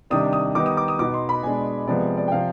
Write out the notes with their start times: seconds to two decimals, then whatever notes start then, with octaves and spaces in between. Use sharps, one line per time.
0.10 C3 D#3 G3 D4 D#6
0.33 D#6
0.55 D#3 G3 B3 D#4 D6
0.66 D#6
0.77 D6
0.88 D#6
0.99 B2 B3 D#4 D6
1.14 C6
1.29 B5
1.43 B2 G#3 D4 G#5
1.87 C3 F3 G#3 B3 D5
2.17 D5
2.28 G5
2.32 C3 F3 F5